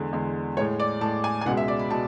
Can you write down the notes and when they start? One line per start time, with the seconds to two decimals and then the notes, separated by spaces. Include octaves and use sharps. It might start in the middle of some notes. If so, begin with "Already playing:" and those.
Already playing: E2 D3 G#3
0.13 E2 D3 G#3
0.57 G#3 C#5
0.60 A2
0.80 D5
1.01 A2 G#3 A5
1.24 G#5
1.41 G#5
1.46 C#2 B2 G#3 F#5
1.57 E5
1.68 D5
1.79 B5
1.90 B2 G#3 A5